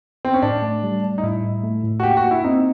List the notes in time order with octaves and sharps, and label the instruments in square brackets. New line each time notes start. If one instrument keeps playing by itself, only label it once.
[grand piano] C4
C#4
[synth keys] A2 [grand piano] D4
[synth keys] A3
G3
G3
[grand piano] D#4
[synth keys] A2 [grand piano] E4
[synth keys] A2
A3
A2
[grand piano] F#4
[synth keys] A#3 [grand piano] G4
[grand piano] F#4
[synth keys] A#3
[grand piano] E4
[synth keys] C4 [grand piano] D#4